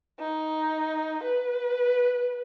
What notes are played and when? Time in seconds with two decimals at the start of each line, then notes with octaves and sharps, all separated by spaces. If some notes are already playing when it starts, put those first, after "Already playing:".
0.20 D#4
1.24 B4